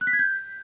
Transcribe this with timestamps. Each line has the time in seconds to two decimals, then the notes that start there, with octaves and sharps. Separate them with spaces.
0.01 F#6
0.07 B6
0.13 G#6
0.19 G6